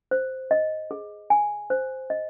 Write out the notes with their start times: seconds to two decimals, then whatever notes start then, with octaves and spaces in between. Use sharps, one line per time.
0.11 C5
0.51 D#5
0.91 G#4
1.30 G#5
1.70 C5
2.10 D#5